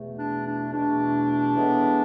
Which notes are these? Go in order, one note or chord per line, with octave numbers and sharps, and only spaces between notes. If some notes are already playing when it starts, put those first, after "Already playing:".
Already playing: E2 B2 A3
D4
D4
E2 B2 A3 D4
A2 E3 G#3 B3